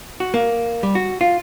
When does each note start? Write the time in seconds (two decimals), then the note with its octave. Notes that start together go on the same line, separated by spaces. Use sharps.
0.20 F#4
0.34 A#3
0.83 G3
0.95 F#4
1.21 F4